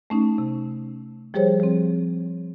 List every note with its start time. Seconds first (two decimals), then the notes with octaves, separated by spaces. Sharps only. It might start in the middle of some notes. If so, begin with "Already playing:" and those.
0.10 A3 C#4 D#4
0.38 C3
1.34 F3 G3 G4 G#4 C5 C#5
1.60 F3 C4